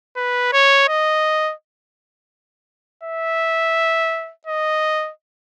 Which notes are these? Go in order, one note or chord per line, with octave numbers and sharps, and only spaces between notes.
B4
C#5
D#5
E5
D#5